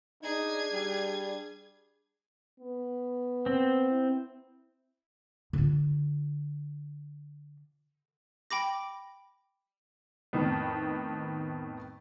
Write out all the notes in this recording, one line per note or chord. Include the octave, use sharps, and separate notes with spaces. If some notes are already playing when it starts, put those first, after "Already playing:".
D4 D#4 G#4 G#6
G3
B3
C4
E4
D3 F4
G5 B5 D6 A#6
F2 A2 D#3 B3